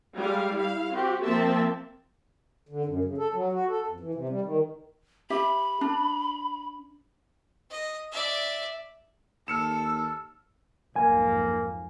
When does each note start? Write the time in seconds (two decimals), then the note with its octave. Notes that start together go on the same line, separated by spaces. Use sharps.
0.16 G3 G#3 F5
0.55 E4 F5
0.91 C4 F#4 G4
1.25 F3 A#3 C4 E5 A5
2.69 D3
2.86 F#2
3.04 C#3
3.18 A4
3.34 F#3
3.52 F#4
3.68 A4
3.87 F2
4.00 E3
4.15 C3
4.29 G3
4.41 D#3
5.30 G4 E5 B5
5.81 D4
7.70 D#5
8.11 D5 E5
9.48 D#2 A4 E6 F6 C#7 E7
10.96 B1 F2 G#2 A#3 G#5